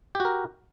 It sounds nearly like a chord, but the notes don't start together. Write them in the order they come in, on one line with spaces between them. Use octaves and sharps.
G4 F#4 A#4